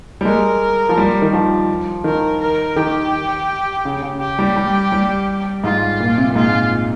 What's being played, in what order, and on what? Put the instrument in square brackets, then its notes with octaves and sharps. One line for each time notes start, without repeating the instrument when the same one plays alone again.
[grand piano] G3
[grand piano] G#3 [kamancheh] A#4
[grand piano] F3
G3
D#3
F3
[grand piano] D#3 [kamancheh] A#4
[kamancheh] A#4
[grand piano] D#3 [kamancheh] G4
[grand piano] C#3
C#3
[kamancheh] G4
[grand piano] G3
G3
G3
[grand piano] G#2 [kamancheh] F4
[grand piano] A#2
C3
A#2
[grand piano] G#2 [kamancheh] F4